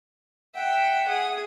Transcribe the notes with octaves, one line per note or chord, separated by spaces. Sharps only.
E5 F#5 G5
G#4 D#6